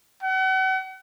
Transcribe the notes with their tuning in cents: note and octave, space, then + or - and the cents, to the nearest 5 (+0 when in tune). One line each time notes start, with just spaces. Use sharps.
F#5 +40